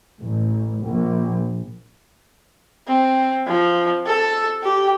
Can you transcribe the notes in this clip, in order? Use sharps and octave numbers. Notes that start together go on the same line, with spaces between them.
A1
A#1
C4
F3
A4
G4